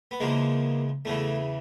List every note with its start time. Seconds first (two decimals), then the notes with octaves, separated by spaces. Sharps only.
0.11 B3
0.20 E2 C#3 F3 G#3 A#3
1.05 E2 C#3 E3 A3